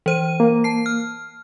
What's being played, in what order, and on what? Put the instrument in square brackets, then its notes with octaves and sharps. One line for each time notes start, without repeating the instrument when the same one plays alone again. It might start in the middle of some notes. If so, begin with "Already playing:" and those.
[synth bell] E3 C5 D#7
[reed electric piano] A#3
[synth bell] A5 C7
F6